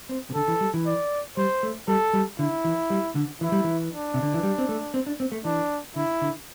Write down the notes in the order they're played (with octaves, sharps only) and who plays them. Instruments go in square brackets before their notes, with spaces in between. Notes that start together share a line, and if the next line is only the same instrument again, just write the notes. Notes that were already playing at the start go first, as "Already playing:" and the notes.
[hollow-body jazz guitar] C4
C3
[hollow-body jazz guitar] D3 [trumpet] A4
[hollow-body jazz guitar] E3
G3
E3
[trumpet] D5
[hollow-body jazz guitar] G3 [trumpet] C5
[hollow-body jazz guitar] A3
[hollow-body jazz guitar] G3 [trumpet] A4
[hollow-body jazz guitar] G3
[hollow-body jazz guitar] D3 [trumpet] E4
[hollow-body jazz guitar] E3
G3
D3
[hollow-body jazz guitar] E3 [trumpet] E4
[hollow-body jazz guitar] G3
E3
[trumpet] D4
[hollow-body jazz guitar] C3
D3
E3
G3
C4
A3
C4
D4
C4
A3
[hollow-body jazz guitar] E3 [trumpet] D4
[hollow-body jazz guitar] D3 [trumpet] E4
[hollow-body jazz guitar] D3